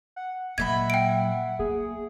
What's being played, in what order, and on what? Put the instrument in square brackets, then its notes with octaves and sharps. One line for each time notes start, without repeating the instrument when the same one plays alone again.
[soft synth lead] F#5
[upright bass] A#2 F#3 [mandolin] D#5 E5 B5 [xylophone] G#6
[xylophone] G5 D7
[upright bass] A#3 [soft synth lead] G#4